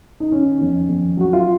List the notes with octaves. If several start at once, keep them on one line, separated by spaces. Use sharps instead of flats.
D#4
D#3 C#4
F2
F2
F#3 F#4
F4